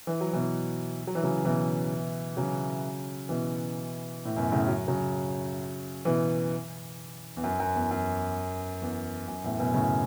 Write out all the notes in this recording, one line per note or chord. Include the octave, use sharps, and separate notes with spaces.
E3
F#3
B2 E3
F#3
E3
C#3 F#3
B2 E3
C#3 F#3
B2 E3
A2
F#2 B2
A2 C#3
F#3
C#3 F#3
B2 E3
E2
F#2
F#2
E2
F#2
E2
F#2
E2 A2
F#2 B2
A2 C#3